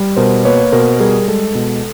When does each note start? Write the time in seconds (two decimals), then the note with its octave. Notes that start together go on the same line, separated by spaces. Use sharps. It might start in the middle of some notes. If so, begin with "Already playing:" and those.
Already playing: G3
0.16 B2 A#4 C5
0.45 A#3 B4 C#5
0.72 B2 A#4 C5
1.00 G3 G#4 A#4
1.28 G#3 A4
1.55 B2